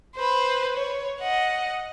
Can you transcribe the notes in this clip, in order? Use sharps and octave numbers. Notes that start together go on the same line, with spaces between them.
B4 C5
C#5
D#5 F#5